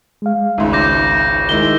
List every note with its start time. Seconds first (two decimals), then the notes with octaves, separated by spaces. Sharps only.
0.22 G#3 F5
0.58 G#1 C#2 D#4 E5 C6
0.73 D6 G6 A#6
1.49 D#3 G#3 E4 G7